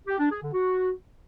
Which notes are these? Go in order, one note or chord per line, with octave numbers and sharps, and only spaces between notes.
G4
D4
G#4
D3
F#4